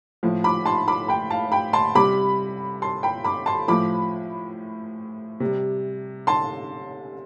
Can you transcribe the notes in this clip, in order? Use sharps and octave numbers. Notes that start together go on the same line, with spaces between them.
A2 F3
B5 D6
A5 C6
B5 D6
G5 B5
F5 A5
G5 B5
A5 C6
C3 G3 B5 D6
A5 C6
G5 B5
B5 D6
A5 C6
A2 F3 B5 D6
C3 G3
A5 C6